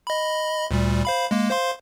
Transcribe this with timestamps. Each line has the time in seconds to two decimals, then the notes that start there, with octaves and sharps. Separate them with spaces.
0.07 D#5 B5
0.71 D2 A#2 G3
1.05 C5 F5 B5
1.31 G#3 A#3
1.50 C5 F5 C6